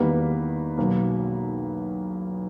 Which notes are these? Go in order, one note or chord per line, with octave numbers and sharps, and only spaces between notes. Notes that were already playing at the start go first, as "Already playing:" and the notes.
Already playing: E2 D#3 G3 A#3 B3 B4
B1 B2 A#3